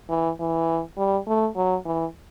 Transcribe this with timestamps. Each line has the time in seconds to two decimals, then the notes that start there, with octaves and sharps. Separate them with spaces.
0.09 E3
0.40 E3
0.97 G3
1.27 A3
1.56 F#3
1.85 E3